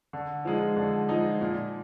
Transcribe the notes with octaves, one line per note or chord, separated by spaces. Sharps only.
D3
F3 G#3 D#4
D3
F3 G#3 D#4
A#2